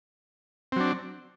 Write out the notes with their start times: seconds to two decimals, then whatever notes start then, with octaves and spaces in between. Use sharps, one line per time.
0.72 C4
0.76 F#3
0.80 D4